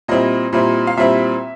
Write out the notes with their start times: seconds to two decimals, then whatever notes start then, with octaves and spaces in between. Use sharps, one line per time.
0.08 A#2 G3 C4 E4 D#5
0.53 A#2 G3 C4 E4
0.87 F5
0.97 A#2 G3 C4 E4 E5